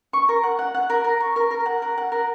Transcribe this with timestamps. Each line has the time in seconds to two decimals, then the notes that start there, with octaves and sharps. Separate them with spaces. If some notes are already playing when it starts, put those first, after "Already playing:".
0.13 C#6
0.29 A#4
0.43 F#5
0.59 F#5
0.75 F#5
0.90 A#4
1.04 A#4
1.20 C#6
1.36 A#4
1.51 A#4
1.66 F#5
1.82 A#4
1.98 F#5
2.12 A#4